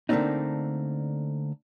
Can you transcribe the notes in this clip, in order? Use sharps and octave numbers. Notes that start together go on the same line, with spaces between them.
D3 A3 A#3 C4 D4 D#4